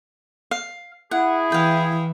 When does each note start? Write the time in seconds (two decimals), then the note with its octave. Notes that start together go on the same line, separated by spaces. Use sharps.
0.51 F5
1.11 E4 G#4 F#5
1.52 E3 F5 G5